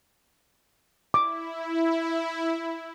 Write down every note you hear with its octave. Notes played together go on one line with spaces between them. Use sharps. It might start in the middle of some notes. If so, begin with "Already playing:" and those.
E4 D6